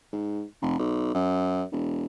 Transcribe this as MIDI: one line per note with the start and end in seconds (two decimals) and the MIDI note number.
0.12 0.43 44
0.62 0.75 29
0.79 1.10 35
1.15 1.63 42
1.72 2.06 28